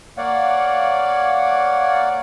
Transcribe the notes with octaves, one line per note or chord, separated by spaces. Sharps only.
A#3 C#5 D5 F5 F#5